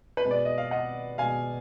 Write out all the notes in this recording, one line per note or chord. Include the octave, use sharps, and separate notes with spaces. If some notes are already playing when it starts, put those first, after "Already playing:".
B4
B2 G#3
D5
D#5
F5
D#5 F#5
B2 G#3 F5 G#5